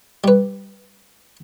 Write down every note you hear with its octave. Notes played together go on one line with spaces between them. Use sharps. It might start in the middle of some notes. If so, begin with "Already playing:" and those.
G3 B4